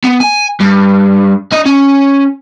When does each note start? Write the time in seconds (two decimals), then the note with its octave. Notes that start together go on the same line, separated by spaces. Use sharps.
0.04 B3
0.20 G#5
0.60 G2
1.52 D4 D#5
1.65 C#4